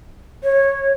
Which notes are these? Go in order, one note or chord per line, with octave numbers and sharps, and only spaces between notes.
C#5